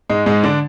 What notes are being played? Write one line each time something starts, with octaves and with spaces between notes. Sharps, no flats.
G#2 G#3
G#2 G#3
D3 D4